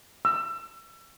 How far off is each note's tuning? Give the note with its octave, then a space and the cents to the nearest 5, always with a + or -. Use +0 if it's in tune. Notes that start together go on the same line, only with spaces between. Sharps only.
E6 +30